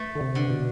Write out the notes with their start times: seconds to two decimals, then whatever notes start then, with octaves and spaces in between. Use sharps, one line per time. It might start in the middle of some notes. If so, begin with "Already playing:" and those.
Already playing: A3
0.15 D3
0.21 C3
0.35 D3
0.50 B2